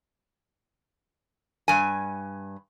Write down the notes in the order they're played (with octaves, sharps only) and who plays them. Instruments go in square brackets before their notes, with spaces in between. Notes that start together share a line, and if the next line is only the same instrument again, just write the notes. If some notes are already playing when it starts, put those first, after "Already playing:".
[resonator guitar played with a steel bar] G2 G#5